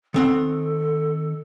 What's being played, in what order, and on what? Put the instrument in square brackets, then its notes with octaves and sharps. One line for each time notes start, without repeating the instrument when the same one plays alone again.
[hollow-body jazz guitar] D#3 C4 F#5 [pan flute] A4